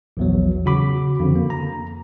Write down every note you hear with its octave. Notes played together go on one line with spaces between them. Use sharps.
A#1 E2 F#3
C#3 F#4 B5 D6
F2 D3
A#3
A#5